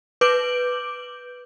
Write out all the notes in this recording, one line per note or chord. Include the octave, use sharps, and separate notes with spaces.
B4 D6 G6 D7 F#7